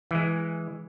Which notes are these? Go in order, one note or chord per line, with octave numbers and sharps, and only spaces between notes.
E3 G#3